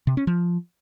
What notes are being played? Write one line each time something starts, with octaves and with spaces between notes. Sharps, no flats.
C3
C#4
F3